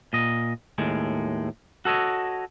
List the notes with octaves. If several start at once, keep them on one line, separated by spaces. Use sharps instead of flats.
A#2 D#5
D#2 A2 G#3
F#4 A4 C#5 D#5